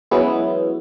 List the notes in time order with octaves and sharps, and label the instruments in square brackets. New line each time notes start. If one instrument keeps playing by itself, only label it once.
[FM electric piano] E3 F#3 G#3 B3 C#4 E4